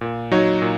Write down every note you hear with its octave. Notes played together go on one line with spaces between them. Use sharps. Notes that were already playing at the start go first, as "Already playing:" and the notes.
A#2
F#3 D#4 F#4 C#5
A#2